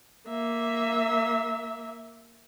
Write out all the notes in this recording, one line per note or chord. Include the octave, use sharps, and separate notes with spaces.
A#3 E5